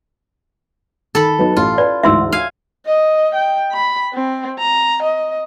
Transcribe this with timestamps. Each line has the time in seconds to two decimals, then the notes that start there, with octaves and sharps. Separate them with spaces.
1.15 D#3 A4 A5 B5
1.39 F#3 B3 D#4
1.57 A1 F4
1.78 B4 D5
2.03 D2 G#2 E3 E5 C6 E6
2.32 F5 G#5
2.86 D#5
3.35 G5
3.72 B5
4.14 C4
4.59 A#5
5.02 D#5